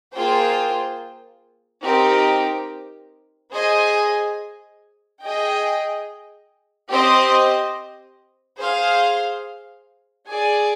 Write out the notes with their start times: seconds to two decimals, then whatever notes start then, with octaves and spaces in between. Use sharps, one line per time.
0.14 A#3 F4 G#4 C5 G5
1.84 C4 D#4 G4 A#4
3.53 G#4 C5 D#5 G#5
5.22 G#4 D#5 G5
6.91 C4 G4 C5 D#5
8.60 G#4 C5 F5
10.29 G#4 D5 G#5